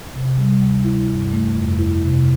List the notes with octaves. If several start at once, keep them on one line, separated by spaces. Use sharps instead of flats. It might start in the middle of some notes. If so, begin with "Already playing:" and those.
C3
G3
D2
E4
G2
A3
F2
E4
C3